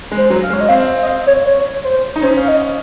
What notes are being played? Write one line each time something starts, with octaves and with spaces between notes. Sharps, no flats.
G#3
C5
F#3
F5
G#3
C#5
D#5
C4 F5
D#5
F5
C#5
C#5
C5
D#4
C#4 C5
F5
D#5